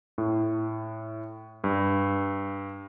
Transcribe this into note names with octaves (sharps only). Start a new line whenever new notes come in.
A2
G2